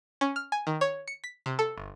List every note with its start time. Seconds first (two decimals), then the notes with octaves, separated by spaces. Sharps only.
0.21 C#4
0.36 F6
0.52 G#5
0.67 D#3
0.81 C#5
1.07 C#7
1.24 B6
1.46 C3
1.59 A4
1.78 G1